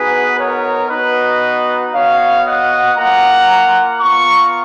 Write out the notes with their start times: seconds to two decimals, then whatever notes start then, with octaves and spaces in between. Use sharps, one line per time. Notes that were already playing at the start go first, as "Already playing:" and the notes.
Already playing: B3 D#4 F#4 G#4 B4
0.38 A#4 C#5
0.90 B3 D#4 F#4 B4 D#5
1.93 B3 F#4 C#5 F5
2.45 D#5 F#5
2.96 A#3 F4 F#5 A#5
4.00 B3 F4 A#5 C#6